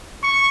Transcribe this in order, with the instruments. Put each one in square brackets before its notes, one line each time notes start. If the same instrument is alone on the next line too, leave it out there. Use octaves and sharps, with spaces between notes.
[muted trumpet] C#6